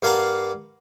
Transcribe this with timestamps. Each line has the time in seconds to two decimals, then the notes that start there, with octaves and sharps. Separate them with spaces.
0.02 G2 A#3 F5 F#5 A5 A#5